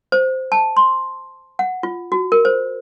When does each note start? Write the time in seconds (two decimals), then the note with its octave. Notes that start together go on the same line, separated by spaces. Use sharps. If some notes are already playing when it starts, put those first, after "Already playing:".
0.12 C5
0.52 A5
0.77 C6
1.59 F#5
1.83 F4
2.12 F#4
2.32 A#4
2.45 C5